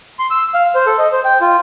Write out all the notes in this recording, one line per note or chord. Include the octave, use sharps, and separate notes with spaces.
C6
E6
F5
C5
A4
D#5
C5
G5
F4